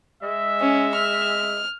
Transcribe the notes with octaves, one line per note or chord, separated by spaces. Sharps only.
G#3 E5
C#4
F6